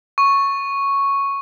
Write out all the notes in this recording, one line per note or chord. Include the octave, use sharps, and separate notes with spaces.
C#6